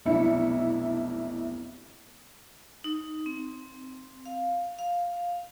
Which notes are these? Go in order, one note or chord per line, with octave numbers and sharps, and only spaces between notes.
F1 B1 D4 E4 E5 C#7
D#4
C4
F5
F5